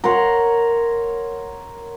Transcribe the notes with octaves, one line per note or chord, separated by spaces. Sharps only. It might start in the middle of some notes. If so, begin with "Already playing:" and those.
A#4 C#5 F#5 C6